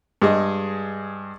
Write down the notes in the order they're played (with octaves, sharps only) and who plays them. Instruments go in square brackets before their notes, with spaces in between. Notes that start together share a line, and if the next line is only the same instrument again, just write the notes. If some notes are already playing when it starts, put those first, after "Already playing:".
[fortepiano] G2 G#3 G#4 D#5